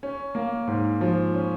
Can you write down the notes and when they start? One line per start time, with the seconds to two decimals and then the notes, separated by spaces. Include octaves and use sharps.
0.03 C#4
0.35 A#3
0.67 G#2
1.01 F3
1.34 C#4